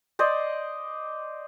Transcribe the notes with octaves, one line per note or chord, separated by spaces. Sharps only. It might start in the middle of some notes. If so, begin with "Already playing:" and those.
C5 D5 D#5